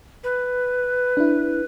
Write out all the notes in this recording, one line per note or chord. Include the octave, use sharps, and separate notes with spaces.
B4
D4 E4